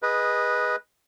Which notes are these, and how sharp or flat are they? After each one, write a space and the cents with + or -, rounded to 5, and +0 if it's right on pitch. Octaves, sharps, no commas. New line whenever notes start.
G#4 -15 B4 -10 D#5 +0